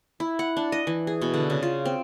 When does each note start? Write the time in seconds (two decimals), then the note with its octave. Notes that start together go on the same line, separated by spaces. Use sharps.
0.20 E4
0.39 F#5
0.57 D4
0.72 D#5
0.87 E3
1.07 G#4
1.21 B2
1.34 D3
1.50 C#3
1.63 F4
1.85 C4